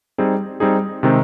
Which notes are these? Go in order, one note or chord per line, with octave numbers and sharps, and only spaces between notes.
G3 C4 D#4 G#4
G3 C4 D#4 G#4
C3 D#3 G#3 C4